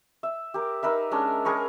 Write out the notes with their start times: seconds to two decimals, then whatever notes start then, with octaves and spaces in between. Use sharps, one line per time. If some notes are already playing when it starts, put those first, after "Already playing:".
0.23 E5
0.54 G4 A#4
0.83 D#4 A#4 B4 E5
1.11 G#3 C#4 D4 A#4
1.45 G#4 A#4 B4 C#5